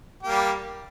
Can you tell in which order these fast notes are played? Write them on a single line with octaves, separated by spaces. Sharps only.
G4 A#3 G3